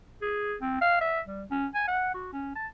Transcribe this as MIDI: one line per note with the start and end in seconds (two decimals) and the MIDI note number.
0.22 0.55 68
0.61 0.78 60
0.81 0.99 77
1.01 1.20 76
1.27 1.43 55
1.51 1.67 61
1.74 1.84 80
1.87 2.11 78
2.14 2.32 66
2.33 2.54 61
2.55 2.66 81